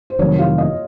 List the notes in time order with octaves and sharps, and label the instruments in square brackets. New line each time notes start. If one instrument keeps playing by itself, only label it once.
[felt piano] C5
[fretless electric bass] F1 F2 D#3 F#3 [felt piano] C#5
[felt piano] F4
D#5